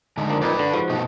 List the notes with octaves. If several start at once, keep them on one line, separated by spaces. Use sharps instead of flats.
D3 G#3 D#4
F3 A#3 D4
F2 A#2 D#4 B4 D5
D3
G#2 F3 F#4
B2 A3 D#4